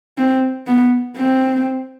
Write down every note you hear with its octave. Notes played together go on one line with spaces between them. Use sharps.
C4
B3
C4